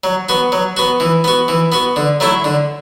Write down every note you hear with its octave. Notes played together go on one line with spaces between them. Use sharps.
F#3
B3 F#4
F#3
B3 F#4
E3
B3 F#4
E3
B3 F#4
D3
F#3 A3 E4
D3